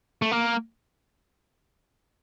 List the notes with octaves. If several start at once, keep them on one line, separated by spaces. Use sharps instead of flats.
A3
A#3